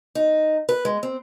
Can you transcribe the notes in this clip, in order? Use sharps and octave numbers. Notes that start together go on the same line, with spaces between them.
D#4
B4
G#3
C4